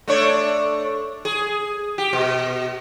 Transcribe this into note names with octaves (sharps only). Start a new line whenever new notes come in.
A3 D4 C#5
G#4
G4
B2